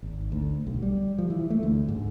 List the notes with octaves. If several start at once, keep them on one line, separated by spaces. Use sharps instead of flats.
G#1
D2
B1
G3
F3
E3
A3
D2
G#2